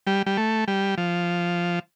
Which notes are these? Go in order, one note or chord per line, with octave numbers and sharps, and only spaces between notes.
G3
G3
A3
G3
F3